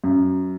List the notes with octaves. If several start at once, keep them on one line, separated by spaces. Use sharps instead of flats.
F#2